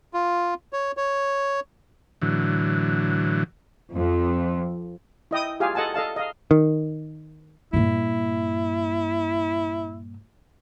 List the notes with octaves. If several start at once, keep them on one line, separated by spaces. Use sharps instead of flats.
F4
C#5
C#5
A2 D3 E3 F#3
F2
E4 D#5 G5 D#6
F4 G4 G#4 F5 G#5
A4 D#5 F#5 G#5 A5
A4 D#5 F5 A5
D#5 F5
D#3
G2 A#2 E4